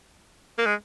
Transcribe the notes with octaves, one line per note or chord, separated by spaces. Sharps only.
A#3
G#3